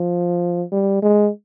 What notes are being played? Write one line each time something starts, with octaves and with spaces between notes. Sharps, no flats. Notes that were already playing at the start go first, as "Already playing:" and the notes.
Already playing: F3
G3
G#3